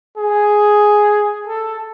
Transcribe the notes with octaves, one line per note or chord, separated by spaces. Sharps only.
G#4
A4